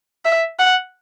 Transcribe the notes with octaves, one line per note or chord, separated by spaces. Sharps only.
E5
F#5